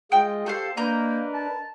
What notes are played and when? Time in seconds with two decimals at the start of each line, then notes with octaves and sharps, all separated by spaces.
0.12 G#3 F4 D#5 G5
0.46 G4 A4 C5 F5
0.77 A#3 D4 A#4 B4 D#5 A#5 G6
1.34 A5